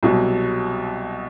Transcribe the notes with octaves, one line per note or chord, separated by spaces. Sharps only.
C2 B2 F#3